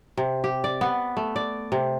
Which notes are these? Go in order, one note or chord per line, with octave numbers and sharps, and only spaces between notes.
C3
G4
D5
B3
A3
D5
C3